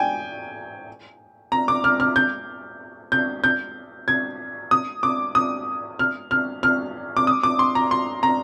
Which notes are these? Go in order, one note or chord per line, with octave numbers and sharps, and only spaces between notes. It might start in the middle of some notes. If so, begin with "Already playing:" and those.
Already playing: G5 G#5
A#5
D6
F6
F6
G6
G6
G6
G#6
D#6
D6
D#6
F6
F6
F6
D6
D#6
D6
C6
A#5
C6
A#5